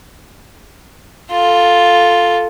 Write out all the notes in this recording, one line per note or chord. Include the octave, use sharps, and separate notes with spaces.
F4 A4